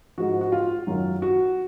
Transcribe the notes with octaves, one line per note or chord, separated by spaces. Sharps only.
G#2 F3 F#4
F#4
F4
F#2 D#3 F#3
F#4